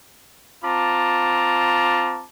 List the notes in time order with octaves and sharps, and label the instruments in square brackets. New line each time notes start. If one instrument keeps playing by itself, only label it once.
[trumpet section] C4 F4 A5 A#5 D6